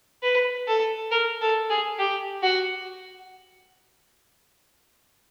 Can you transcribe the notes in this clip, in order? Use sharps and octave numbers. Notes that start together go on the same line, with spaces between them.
B4
A4
A#4
A4
G#4
G4
F#4